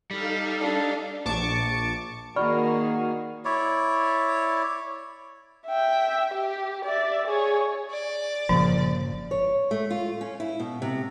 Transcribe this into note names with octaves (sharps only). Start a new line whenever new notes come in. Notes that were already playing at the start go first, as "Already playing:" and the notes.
G3 D#4 A4 F5
D4
A#1 A5 C#6 D6 C#7
D#3 A#3 F#4 G#4 D5 B5 C#6 F6
E4 C#5 D5
E5 G5
G4
D5 E5
G#4 C#5
D5
G1 A#2 C#3 F3
C#5
A3
F4
C#4
E4
B2
C3